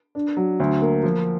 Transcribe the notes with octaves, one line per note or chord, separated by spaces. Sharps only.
D4
F#3
D2
A#3
F3